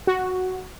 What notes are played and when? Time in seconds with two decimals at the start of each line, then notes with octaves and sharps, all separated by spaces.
0.07 F#4